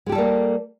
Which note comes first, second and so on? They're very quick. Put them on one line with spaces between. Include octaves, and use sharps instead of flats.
G#3 G4 A4 G3 A#3